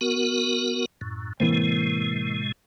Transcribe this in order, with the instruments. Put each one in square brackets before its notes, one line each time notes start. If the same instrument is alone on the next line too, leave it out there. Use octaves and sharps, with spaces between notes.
[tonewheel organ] B3 F#4 A#4
F#2 A2
[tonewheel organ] A2 C3 G#3 [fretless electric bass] E3 A#3 C4